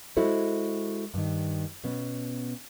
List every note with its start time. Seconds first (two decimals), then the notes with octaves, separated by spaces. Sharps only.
0.17 G#3 E4 F#4 A4 C5
1.14 G2 D#3
1.84 B2 B3 C#4